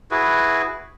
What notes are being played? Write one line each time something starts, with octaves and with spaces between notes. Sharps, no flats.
E4 F#4 G#4 B4